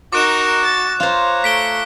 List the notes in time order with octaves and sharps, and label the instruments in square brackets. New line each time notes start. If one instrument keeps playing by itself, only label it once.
[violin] D#4 A#4 [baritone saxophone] F#4 [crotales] D6 F#6 E7
[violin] A6
[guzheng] F4 C5 [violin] C#5 A#5
[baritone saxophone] A3 [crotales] B6 D7 G7